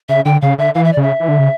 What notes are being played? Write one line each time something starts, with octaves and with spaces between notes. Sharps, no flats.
C#3 E5
D3 G5
C#3 F5
D3 E5
E3 F5
E5
D5
C#3
E5
E3
D3
C#3